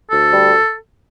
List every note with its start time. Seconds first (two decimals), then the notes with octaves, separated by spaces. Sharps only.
0.10 D2 A4
0.33 G3